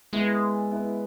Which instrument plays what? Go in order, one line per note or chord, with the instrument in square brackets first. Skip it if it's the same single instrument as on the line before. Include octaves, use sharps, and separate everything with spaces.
[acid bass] G#3 [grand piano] B3 E4
[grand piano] B3 E4